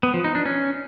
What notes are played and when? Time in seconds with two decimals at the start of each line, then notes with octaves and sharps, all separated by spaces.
0.03 B3
0.14 F3
0.24 D#4
0.35 D4
0.46 C#4